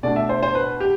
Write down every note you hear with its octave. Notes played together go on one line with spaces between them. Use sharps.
B2 A3 D4 D5
E5
C5
C5
B4
G4